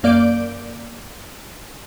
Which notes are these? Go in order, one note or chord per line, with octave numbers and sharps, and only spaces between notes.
F#2 A#3 D5 G6 D7